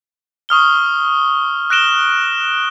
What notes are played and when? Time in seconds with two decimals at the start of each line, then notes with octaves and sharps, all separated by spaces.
0.49 C#6 D#6 F6 G7
1.70 F#6 A#6 D7 E7 G7